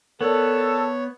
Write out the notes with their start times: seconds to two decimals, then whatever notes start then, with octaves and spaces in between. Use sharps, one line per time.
0.21 B3 A4 A#4 C#5 D5